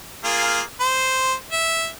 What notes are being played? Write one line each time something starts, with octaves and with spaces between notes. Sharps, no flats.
A#3 F4 G#4
C5
E5